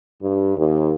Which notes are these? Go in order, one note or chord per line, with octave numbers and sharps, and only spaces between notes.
G2
D#2